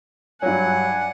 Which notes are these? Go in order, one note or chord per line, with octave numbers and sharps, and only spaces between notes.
G2 F#3 D4 F#5 G#5